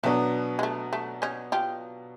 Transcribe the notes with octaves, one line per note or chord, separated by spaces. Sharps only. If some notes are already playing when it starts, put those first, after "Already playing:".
B2 F#3 A3 B3 D4
G#3
A3
A3
C#4 D#4
F4 G4